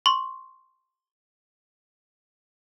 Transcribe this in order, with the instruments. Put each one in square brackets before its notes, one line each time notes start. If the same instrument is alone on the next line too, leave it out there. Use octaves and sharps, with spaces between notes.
[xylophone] C6 C#6